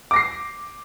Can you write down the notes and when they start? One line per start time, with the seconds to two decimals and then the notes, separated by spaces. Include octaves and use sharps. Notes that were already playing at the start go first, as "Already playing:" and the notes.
0.11 D6
0.14 A#6
0.16 C7